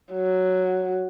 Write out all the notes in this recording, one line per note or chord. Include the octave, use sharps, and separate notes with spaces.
F#3